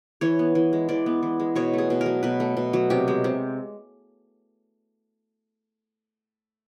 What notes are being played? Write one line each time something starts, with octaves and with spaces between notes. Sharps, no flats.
E3 C#5
B3
E3
G#3
E3 D5
B3
E3
G#3
B2 C#5
A3 G#4
B2
A#4
F#3
B2 B4
A3
B2
F#3
C3 G4
G#3
C3